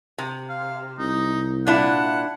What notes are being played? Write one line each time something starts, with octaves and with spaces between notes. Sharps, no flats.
C3
F5
C2 D#4
A#2 D4 E4 F#5